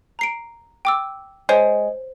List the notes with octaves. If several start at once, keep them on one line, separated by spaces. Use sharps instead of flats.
A#5 C7 D7
G5 D6 E6
G#3 C5 C#5 C7